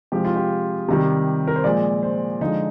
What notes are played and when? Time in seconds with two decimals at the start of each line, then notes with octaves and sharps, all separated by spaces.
0.12 C3 F3 G#3 G4
0.25 F4
0.36 G4
0.88 C3 D#3 G3
1.47 A#4
1.56 C5
1.64 A#2 F3 G#3 D5
2.03 C5
2.41 D3 F3 G#3 D#4